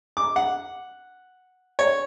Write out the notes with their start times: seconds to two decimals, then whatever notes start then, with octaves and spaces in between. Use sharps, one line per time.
0.17 D6
0.36 F#5
1.79 C#5